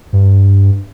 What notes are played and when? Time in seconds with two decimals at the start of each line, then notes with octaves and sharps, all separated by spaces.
0.13 G2